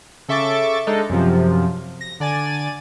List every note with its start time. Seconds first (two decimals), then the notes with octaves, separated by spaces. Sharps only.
0.28 C#3 A4 E5 C#6 D6 A6
0.87 G#3 D4 D#4 A4
1.10 F#2 C3 F3
2.01 A#6
2.20 D3 D5 G#5 A6 D#7